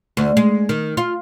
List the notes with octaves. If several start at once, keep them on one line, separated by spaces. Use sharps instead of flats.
D2
G#3
D#3
F4